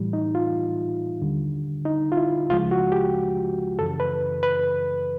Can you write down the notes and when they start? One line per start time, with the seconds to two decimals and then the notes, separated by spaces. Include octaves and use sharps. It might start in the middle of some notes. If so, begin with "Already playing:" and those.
Already playing: A2 E3 G3
0.13 D#4
0.35 F4
1.21 D#2 D3 G3
1.85 D#4
2.12 F4
2.17 E4
2.49 C#2 C#3 F3 G#3 F4
2.71 F#4
2.92 G4
3.79 F#2 C#3 E3 A4
4.00 B4
4.43 B4